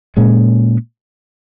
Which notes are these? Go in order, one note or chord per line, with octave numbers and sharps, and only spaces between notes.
A#2 G#3 C#4